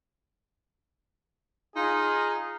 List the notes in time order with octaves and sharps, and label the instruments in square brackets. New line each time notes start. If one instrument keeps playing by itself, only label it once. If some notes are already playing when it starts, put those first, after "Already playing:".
[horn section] D#4 F4 G#4